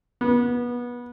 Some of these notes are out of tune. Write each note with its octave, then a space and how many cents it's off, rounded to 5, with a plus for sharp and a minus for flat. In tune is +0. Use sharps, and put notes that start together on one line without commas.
B3 -25